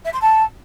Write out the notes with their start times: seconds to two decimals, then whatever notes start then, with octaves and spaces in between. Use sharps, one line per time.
0.05 E5
0.13 C6
0.21 A5